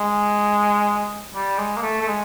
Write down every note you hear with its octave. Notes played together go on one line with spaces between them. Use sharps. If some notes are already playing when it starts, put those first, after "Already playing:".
Already playing: G#3
G3
G#3
A#3
A3
A3
G#3